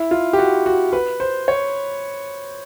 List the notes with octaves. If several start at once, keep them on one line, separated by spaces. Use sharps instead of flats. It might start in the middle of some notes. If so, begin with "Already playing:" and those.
Already playing: E4
F4
G4
F#4
F#4
B4
C5
C#5